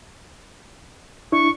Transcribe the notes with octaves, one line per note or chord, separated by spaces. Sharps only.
D4 E4 C#6